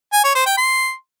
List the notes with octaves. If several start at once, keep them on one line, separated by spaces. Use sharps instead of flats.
G#5
C#5
C5
G5
C6